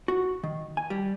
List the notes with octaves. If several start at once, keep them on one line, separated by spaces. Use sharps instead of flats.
F#4
D#3
G#5
G3